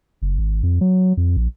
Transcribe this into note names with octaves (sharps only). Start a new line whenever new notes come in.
F#1
G#1
F2
F#3
F2
A#1